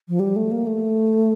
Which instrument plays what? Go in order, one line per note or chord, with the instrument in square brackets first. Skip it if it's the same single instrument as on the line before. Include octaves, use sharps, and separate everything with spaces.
[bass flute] F3
G3
A3
A#3
A3